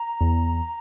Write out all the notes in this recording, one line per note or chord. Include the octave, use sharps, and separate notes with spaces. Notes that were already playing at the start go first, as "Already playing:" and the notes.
Already playing: A#5
E2